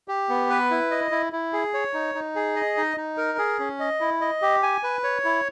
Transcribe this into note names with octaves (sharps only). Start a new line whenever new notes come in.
G4
B3
B4
E4
D#5
E4
E4
G#4
C#5
D#4
D#4
G#4
D#5
D#4
D#4
A#4
G#4
C#4
D#5
E4
D#5
G4
G#5
B4
C#5
E4